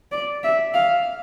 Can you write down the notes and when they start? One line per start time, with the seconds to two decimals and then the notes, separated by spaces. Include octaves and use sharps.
0.12 D5
0.43 E5
0.74 F5